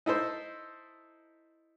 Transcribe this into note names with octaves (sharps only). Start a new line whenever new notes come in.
D#4 E4 A4 C5